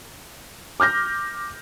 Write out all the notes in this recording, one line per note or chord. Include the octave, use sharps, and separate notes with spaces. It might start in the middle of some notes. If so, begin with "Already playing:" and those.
D6 F6 G6 A#6